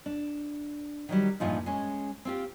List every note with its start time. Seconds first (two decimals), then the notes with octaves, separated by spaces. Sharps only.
0.06 D4
1.09 D#3 F#3 G3
1.40 E2 G2 A#2 F3 D#4
1.66 G#3 C#4
2.25 C4 F4 G4